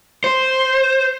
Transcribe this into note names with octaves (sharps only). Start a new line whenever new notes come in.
C5